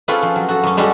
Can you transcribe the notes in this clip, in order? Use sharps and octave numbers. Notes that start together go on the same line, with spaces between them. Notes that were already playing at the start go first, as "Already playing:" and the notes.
C4 C#4 F4 G#4 A4 B4
F3
F#3
F#4 A4
F#2 C#4
G3 G#3 C#4 F#4 G4 A4